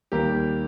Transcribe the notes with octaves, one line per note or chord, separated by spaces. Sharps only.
D#2 D#3 G3 A#3 G4 A#4